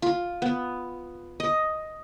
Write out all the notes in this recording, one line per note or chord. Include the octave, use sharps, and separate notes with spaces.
F4
B3
D#5